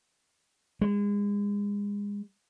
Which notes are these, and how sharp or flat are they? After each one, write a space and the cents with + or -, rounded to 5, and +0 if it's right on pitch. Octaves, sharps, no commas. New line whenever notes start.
G#3 -30